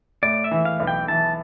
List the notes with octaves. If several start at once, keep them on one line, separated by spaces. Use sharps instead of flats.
A2 D5
E5
E3
F5
B1
G5
E3 A5